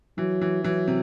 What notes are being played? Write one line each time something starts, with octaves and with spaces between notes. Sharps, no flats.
E3 F#3
E3
E3 F#3
C3